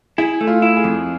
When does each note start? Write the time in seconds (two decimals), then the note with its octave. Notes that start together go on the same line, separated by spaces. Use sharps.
0.18 E4 G#4
0.41 A3
0.47 F4
0.62 E4
0.77 G#4
0.84 F2